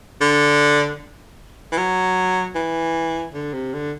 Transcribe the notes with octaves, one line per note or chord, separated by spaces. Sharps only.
D3
E3
F#3
E3
D3
C3
D3